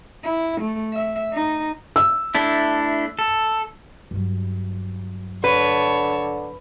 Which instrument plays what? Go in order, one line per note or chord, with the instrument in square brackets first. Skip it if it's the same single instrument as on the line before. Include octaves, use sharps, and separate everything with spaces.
[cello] E4
A3
E5
D#4
[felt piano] E6
[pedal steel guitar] A3 D4 E4
A4
[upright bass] G2 F#3
[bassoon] D3 [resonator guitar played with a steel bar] B4 [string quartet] C#5 A5